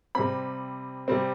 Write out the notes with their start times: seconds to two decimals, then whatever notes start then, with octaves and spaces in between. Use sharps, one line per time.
0.15 C3 G3 C4 B5
1.08 C3 G3 C4